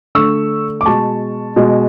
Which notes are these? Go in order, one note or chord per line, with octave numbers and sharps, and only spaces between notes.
D3 A3 C#6 E6
D6
B2 G#3 A5 C#6
B2 G#3